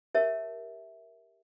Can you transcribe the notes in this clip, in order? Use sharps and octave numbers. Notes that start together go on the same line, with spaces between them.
G4 A#4 C#5 E5 A5